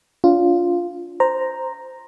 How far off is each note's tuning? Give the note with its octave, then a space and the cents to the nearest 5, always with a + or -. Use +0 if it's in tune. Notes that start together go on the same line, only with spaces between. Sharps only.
D4 -40 F4 +0
C5 -5 A#5 +0